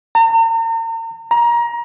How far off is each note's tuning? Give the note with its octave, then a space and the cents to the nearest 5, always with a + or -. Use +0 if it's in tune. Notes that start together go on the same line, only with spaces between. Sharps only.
A#5 -40
A#5 +25